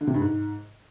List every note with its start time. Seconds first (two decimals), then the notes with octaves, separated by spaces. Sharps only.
0.01 D3
0.07 C3
0.14 G2
0.21 G#2